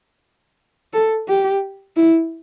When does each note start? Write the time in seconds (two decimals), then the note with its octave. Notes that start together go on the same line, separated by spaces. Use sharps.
0.93 A4
1.28 G4
1.96 E4